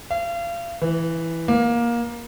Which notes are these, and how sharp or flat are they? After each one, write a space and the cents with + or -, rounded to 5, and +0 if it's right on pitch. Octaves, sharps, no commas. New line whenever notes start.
F5 -35
E3 +0
A#3 +20